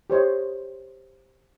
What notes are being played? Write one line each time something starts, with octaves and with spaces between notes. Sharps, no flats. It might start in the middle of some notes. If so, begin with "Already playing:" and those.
G4 C5 C#5 D#5